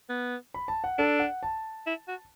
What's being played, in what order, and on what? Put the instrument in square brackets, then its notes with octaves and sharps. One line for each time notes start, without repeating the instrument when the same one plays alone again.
[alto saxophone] B3
[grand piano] B5
A5
F#5
[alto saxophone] D4 [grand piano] A4
[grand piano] F#5
A5
[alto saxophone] E4
F#4